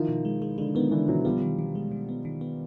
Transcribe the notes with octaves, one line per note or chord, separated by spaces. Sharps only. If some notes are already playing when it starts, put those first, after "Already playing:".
Already playing: D#3 F3 E4
B2
G#3
G#3
D3 G#3
D#3 B3
D3 E3 B3
B2 E3 F#3
F3 G3 B3
D#3
D#3
G#3
D#3
B3
D#3
B3